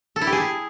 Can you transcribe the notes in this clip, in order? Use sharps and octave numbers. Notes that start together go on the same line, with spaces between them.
A4
E4
G4
G#4